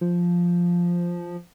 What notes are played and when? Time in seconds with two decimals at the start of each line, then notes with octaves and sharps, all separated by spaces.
0.01 F3